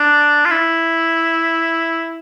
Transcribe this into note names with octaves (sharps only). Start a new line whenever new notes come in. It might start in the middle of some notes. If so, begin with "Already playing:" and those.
Already playing: D4
F4
E4